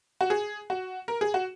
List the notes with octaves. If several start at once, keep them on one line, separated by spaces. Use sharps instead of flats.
F#4
G#4
F#4
A#4
G#4
F#4